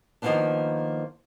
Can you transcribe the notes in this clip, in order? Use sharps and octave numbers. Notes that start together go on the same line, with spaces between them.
D#3 F3 G#3 A#3 B3 D4